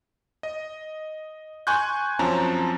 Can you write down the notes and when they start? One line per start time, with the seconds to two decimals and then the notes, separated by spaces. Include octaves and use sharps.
0.43 D#5
1.67 G#5 C6 C#6 F#6 G6
2.19 F#2 F3 C4 C#4 A5 A#5